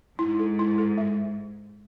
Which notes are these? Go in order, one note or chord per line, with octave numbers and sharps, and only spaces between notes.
G#2 E4
A4
E4
A4
G#3